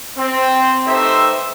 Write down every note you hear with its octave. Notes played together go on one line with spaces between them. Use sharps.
C4
A3 D#4 G4 B4 C5 E5